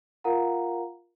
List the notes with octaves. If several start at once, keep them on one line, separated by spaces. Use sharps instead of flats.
F4 A#4 F5 F#5 A#5